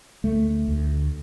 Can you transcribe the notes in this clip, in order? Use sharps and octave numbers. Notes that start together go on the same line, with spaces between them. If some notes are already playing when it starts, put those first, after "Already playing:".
D2 A3
D2